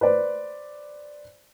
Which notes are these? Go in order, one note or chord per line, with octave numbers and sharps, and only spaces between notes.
B4 C5 D5